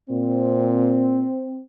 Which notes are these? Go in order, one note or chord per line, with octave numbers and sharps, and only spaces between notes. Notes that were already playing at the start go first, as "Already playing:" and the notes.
A#2 C4